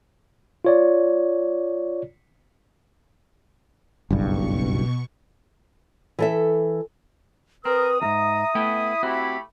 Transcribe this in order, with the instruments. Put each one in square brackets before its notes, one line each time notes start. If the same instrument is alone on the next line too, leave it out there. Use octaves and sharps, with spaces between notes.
[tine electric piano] F4 C#5 D5
[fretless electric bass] F#1 B1 G2 [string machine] B2 C#6
[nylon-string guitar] E3 A4 E5
[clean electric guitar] C4 [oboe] A#4 [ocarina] B4 [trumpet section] D#6
[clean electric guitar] F2 G#2 [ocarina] E5 [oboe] A#5
[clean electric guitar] A3 B3 G5 [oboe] E4
[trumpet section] A3 G4 B5 [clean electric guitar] C4 F#4